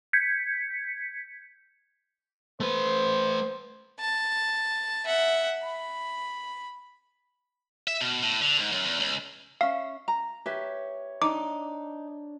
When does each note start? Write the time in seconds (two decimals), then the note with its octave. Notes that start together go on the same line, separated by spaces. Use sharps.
0.13 G6 G#6 B6 C#7
2.60 A3 B4 C5
4.00 A5
5.05 E5 F#5
5.63 B5
7.87 E5
8.01 B2
8.22 A2
8.42 D3
8.60 G#2
8.72 F#2
8.86 E2
9.00 C#2
9.61 C#4 E5 F5
10.08 A#5
10.46 G4 B4 C#5 E5
11.22 D4 D#4 D6